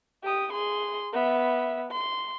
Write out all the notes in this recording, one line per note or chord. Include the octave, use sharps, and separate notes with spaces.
G4 D#6
G#4 C6
B3 E5
C6